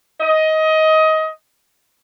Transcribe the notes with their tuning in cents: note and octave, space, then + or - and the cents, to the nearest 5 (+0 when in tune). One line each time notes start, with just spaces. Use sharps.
D#5 +20